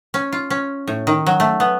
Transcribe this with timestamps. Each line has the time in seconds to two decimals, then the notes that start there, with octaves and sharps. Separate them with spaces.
0.14 C#4
0.32 F4
0.50 C#4
0.87 A2
1.07 D#3
1.26 F#3
1.40 A3
1.60 B3